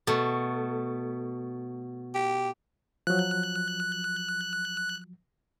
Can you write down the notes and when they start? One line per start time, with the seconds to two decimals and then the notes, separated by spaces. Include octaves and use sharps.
0.07 B2 A3
2.15 G4
3.07 F3 F#3 F#6